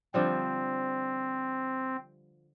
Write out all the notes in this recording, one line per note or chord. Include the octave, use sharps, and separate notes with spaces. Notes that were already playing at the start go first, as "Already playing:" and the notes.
D3 F3 G3 C4